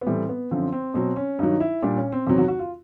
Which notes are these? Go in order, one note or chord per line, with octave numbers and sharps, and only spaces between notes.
B3
A2 E3 G3 C4
B3
F#2 D3 F3 C4
C4
B2 F#3 C4
C#4
G2 D#3 F#3 D#4
E4
A#2 G3 D4
C#4
C4
E2 C3 D#3 F#3 C4
F#4
F#4
F4